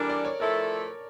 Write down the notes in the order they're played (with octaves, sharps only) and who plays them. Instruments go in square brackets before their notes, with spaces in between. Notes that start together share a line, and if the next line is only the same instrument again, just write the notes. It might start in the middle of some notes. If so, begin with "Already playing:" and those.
Already playing: [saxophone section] E3 G3 D4 [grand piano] A4 A#4
[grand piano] D5
C#5
[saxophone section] F3 A3 E4 A4 [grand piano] A#4